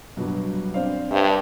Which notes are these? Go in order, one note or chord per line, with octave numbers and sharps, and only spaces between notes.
G2 B2 F#3
C4 D4 F5
G2 C5 E5